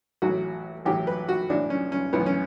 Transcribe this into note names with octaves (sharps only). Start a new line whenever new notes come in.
A1 A2 F#3 F#4
A1 A2 F#3 G4
B4
F#4
B1 A2 E3 D4
C#4
C#4
B1 A2 E3 B3
C#4